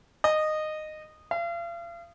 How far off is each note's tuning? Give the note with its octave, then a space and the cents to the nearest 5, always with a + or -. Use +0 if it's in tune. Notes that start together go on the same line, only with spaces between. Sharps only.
D#5 -15
F5 -40